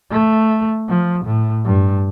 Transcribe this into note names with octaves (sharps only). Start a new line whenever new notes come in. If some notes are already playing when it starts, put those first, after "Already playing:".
A3
F3
A2
G2